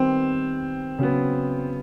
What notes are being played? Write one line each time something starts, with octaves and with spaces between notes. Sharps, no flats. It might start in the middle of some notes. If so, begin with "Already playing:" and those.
Already playing: D#3 G3 B3 C4
C#3 F#3 B3